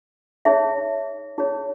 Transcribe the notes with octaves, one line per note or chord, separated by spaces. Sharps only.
D#4 G#4 C#5 E5
D#4 G#4 C#5